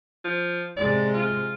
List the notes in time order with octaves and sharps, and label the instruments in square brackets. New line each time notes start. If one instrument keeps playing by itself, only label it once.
[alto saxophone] F3
[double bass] C3 G#3 [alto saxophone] D5
[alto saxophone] F4